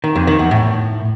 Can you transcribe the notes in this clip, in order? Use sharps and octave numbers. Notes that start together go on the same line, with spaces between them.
D#3
F2
D#3
E2
A2